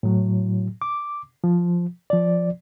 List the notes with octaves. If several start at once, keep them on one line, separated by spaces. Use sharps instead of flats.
A2 F#3
D6
F3
F3 D5